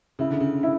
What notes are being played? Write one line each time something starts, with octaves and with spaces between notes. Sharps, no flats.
C#3 E4
D3
C#3
E4